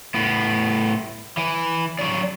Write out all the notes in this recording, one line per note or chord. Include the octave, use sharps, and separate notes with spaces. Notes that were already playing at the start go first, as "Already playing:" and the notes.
A2 B3
E3
F#3 D4